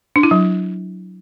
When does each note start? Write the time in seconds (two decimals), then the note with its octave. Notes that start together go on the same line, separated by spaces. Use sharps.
0.16 D4
0.23 E4
0.31 F#3